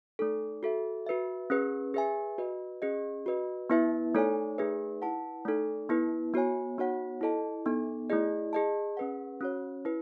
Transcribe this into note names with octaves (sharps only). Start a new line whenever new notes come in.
A3 D#4 A4
F#4 A4 E5
F#4 B4 E5
C#4 G#4 B4
G#4 B4 E5 G#5
F#4 B4 D#5
C#4 G#4 D#5
F#4 B4 D#5
B3 E4 B4 E5
A3 D#4 A4 C#5 G#5
A3 D#4 G#4 B4 E5
E4 B4 F#5 A5
A3 D#4 A4
B3 E4 B4
B3 F#4 C#5 G#5
B3 D#4 F#4 C#5 F#5
E4 A4 D#5 A5
B3 D#4 A4
A3 E4 G#4 D#5
G#4 D#5 A5
C#4 G#4 B4 F#5
C#4 F#4 C#5
E4 B4